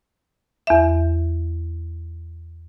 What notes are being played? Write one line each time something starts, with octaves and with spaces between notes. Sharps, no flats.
E2 E5